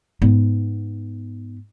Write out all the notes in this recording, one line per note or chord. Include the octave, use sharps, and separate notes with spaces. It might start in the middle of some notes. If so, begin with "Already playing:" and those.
G#2 B3